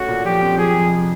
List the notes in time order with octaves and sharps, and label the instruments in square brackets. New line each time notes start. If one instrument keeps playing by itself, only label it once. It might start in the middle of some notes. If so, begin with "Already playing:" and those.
Already playing: [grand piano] A3 C#4 [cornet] F#4
[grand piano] A#2
[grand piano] F3 [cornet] G4
[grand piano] C4
[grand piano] F3 [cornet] G#4
[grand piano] F2
C3